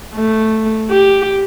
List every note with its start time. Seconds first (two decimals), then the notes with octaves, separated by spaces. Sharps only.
0.15 A3
0.90 G4